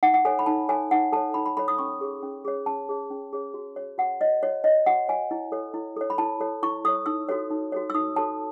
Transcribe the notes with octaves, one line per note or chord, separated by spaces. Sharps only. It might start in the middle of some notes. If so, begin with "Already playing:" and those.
D#4 F#5
F#5
A4 C#5 G#5
B5
D#4 A5
A4 C#5 G#5
D#4 F#5
A4 C#5 A5
D#4 B5
B5
A4 C#5 B5
D#6
C#4 C#6
G#4 C#5
C#4
G#4 C#5
C#4 A5
G#4 C#5
C#4
G#4 C#5
F#4
C#5
F#4 F#5
C#5 D#5
F#4 C#5
C#5 D#5
F#4 F#5
C#5 G#5
E4
A4 C#5
E4
A4 C#5
B5
E4 A5
A4 C#5
E4 C#6
A4 C#5 D#6
D#4 E6
F#4 A4 C#5
D#4
F#4 A4 C#5
E6
D#4 D#6
F#4 A4 C#5 A5